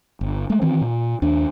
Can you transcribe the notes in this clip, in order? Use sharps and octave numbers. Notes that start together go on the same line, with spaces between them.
G1
G#3 A3
D#3 E3 C4
A#2
D#2 D4